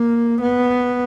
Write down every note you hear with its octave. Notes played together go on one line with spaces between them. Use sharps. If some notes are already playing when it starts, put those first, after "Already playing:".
Already playing: A#3
B3